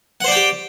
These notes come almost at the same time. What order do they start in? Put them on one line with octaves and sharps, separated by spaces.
F#5 C5 D5 G5 G4